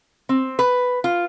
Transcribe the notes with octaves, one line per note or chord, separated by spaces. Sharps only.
C4
B4
F4